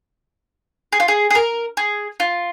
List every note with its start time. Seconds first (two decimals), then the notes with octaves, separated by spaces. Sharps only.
0.92 G#4
1.00 F4
1.08 G#4
1.30 G#4
1.35 A#4
1.77 G#4
2.20 F4